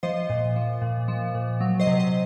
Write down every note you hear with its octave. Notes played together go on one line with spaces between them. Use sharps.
F3 C5 D#5
A#2
F3
A#2
F3
A#2
F#3
C5 D#5
C3
C5 D#5